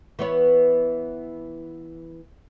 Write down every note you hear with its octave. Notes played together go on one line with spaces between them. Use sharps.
E3 B3 C#5